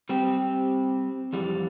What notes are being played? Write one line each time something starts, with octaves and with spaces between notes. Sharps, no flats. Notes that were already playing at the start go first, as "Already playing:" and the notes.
G3 C4 G4
F2 E3 G3